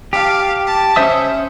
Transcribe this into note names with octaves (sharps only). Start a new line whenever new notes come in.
G4 F5 A5
A5
C#4 C5 E5 D#6